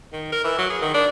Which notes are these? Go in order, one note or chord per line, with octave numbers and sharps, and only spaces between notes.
D#3
A#4
E3
F#3
G#4
D#3
D4